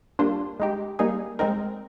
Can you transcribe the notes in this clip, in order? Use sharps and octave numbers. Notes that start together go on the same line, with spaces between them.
G3 A#3 D4 F4 C5
G#3 D#4 G4
G3 A#3 D#4 G#4
G#3 C4 D#4 A#4